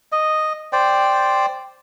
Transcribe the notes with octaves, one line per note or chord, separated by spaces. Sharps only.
D#5
C5 D5 G5